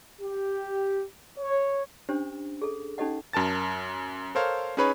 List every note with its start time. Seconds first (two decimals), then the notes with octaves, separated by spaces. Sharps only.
0.21 G4
1.37 C#5
2.09 C#4 D4 G4 C5
2.62 G#4 A4
2.98 C#4 D#4 G4 A4 D#5 F#5
3.33 F#2 A#4 A5 A6
4.35 A4 A#4 C5 C#5 F5
4.77 C#4 D#4 G#4 B4 C#5 B5